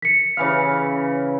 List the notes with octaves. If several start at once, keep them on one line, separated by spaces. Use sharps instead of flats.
B6 C#7
C#3 E3 F5